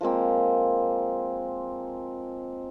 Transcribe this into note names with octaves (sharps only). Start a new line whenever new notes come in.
F3 G#3 A#3 C4